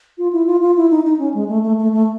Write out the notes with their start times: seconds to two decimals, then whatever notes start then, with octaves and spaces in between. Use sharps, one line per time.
0.18 F4
0.33 E4
0.46 F4
0.62 F4
0.76 E4
0.90 D#4
1.05 D#4
1.19 C#4
1.34 G#3
1.48 A3
1.63 A3
1.78 A3
1.93 A3